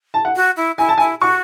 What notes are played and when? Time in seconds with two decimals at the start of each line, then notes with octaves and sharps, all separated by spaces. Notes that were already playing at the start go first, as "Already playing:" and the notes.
0.14 A5
0.25 F#5
0.36 F#4
0.56 E4
0.78 E4 G#5
0.89 A5
0.98 E4 G#5
1.21 F#4 C#6